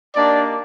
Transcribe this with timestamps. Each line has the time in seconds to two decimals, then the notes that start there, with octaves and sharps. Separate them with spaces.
0.16 A#3 D4 D#4 G4 D5